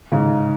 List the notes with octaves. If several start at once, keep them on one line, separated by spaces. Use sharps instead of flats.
G#2 C#3